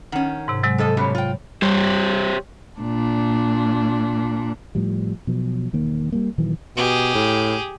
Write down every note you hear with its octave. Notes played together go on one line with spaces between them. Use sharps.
D#3 C#4 F#5
G#2 C3
C3 F#3 G#3
F3 A4 D#5
F#2 B2 G3 C#5 B5
F4 G5
G3 G4 C5 C#5
A#2 D4
A2 F3 G3
B2 F3 F#3
E1 D#3 A#3
G3 A3 A#3
A#2 D#3 E3 F#3
B2 G4 G#4
A2